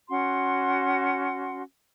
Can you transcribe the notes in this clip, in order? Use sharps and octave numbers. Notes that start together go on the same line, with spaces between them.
C#4 F#4 F#5 C6